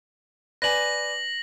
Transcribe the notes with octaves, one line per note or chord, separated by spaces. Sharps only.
B4 D5 G#5 A#6 F#7